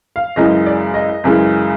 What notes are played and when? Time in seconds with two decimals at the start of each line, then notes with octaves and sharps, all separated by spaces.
0.16 F5
0.36 F#2 C#3 E3 G#3 D#5
0.66 D5
0.94 D#5
1.24 F#2 C#3 E3 G#3